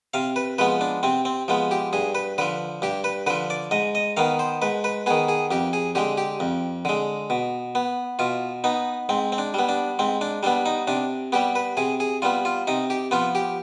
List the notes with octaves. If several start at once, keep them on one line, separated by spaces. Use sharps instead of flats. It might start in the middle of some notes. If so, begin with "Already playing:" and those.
C3 F5
B4
F3 G#3 B3 B4
D4
C3 C4
C4
F3 G#3 B3
G4
G2 G#4
B4
D3 F3 B4
G2 G4
B4
D3 F3 B4
D5
G#2 D#5
D#5
D#3 B3 F5
C5
G#2 B4
B4
D#3 B3 G#4
G#4
F2 G4
G#4
D3 G#3 G4
G4
F2
D3 G#3
B2
B3
B2 F4
B3 D#4
G#2 C4
C4
D4
G3 B3
D4
G#2 C4
D4
G3 B3 D4
D#4
C3 D4
G3 B3 G4
B4
C3 G#4
G#4
G3 B3 F4
F4
C3 D#4
G4
F3 B3 F4
G4